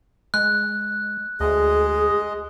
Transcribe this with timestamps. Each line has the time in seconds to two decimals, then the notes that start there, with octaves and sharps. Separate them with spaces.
0.34 G#3 F#6
1.40 D2 G#3 G#4 D#5